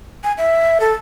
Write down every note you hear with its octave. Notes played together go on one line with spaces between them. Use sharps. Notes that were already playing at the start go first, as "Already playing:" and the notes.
G#5
E5
A4